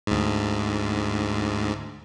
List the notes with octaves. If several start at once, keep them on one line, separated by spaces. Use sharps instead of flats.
D2 G#2